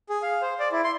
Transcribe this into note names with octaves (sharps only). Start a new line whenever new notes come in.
G#4
F5
C5
D5
E4
C6